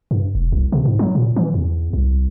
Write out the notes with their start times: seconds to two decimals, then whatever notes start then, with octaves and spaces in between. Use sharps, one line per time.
0.11 G2
0.35 E1
0.52 C2
0.72 C3
0.85 G#2
0.99 F#3
1.15 A#2
1.36 E3
1.54 E2
1.93 C2